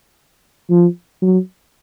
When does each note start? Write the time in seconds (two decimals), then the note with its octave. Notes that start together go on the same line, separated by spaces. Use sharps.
0.70 F3
1.22 F#3